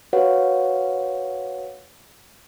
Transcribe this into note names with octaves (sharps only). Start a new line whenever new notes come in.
F#4 B4 C#5 F5 F#5